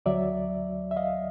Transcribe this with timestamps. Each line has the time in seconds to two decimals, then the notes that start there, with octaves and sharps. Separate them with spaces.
0.06 D2 D3 F#3 D5 E5
0.91 E5
0.96 D#5 F5